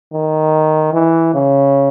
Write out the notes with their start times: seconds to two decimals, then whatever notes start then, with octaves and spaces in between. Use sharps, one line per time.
0.13 D#3
0.93 E3
1.34 C#3